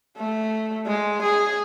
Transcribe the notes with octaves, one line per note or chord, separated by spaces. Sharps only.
A3
G#3
G#4